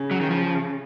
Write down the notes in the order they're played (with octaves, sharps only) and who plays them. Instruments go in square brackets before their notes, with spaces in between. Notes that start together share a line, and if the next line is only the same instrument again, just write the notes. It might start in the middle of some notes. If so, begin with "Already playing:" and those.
Already playing: [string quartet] C#3
[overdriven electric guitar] F#3
D#3
F3